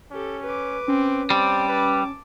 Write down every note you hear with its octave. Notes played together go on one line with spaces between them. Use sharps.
C#4 G4 A4
B4 D6
C4 C#4
G3 C4 A5 D6
B4